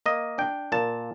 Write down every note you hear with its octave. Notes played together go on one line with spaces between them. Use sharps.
A#3 D#5
D4 G5
A#2 A5